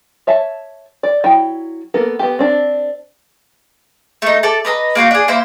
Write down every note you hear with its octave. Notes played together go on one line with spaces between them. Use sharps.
C#5 E5 A5
D5
F#3 E4 G5
A#3 B3 A4 A#4
B3 G4
C4 D4
A3 D#4
A4 D5
B4 D#5 E5 A#5
A#3 F4 F#4 G5
D4 G#4
A#3 E4 C5